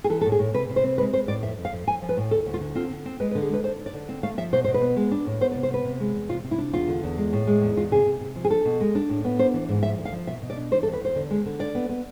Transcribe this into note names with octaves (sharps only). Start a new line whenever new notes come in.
G#4
E3 A4
A2 A4
G#4
A2
C3 B4
C3
C5
C4
G#3 B4
G#3 C5
A2 D5
F2 E5
F2
F5
F2
F3 G#5
F3
B4
A2
D2 A4
D2
F4
D3
C4 F4
D3
C4
G#3 B4
B4
D3
G#4
G#3 B4
D4 C5
D4
D5
D3
C4
A3 F5
F3 E5
B2 C5
B2 C5
B4
B3
G#3
D4
A2
B3 C5
D5
C3
C5
B3 B4
C3
G#3
E2
C3 F4
C3
E4
D4
E2 F4
D3
E2
G#3
A2
G#3
E2
E2 F4
C3 G#4
C3
C3
F3
G#4
D4 A4
B2
G#3
D4
A2
B3
D4 C5
E3
G#2
F3 E5
D2
F5
F3
B2 E5
B2
D5
D4
E3 C5
A4
E2
B4
E2 C5
D3
G#3
D3
D4 D5
B3
B3